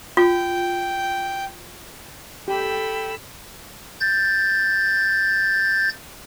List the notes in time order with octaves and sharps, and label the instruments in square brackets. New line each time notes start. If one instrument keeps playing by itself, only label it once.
[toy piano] F4 [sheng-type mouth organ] G5
[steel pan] G4 [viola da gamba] A4 [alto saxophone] G5 [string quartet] B5 E6
[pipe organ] G6 A6